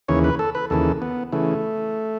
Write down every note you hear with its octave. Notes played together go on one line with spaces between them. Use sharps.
D#2 C#3 E3 C#5
B4
A4
B4
D#2 C#3 E3 A4
B3
C#3 E3 A3